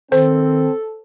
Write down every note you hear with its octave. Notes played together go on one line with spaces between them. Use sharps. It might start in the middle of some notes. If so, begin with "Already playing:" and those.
D#3 C4 A4 C5